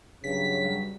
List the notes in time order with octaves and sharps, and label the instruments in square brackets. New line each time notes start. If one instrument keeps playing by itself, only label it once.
[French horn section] G2 F#3 [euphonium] C#3 [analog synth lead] B6
[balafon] G3